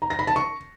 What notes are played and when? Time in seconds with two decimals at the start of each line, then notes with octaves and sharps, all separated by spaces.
0.02 A#5
0.10 A#6
0.19 B5
0.27 A5
0.36 C#6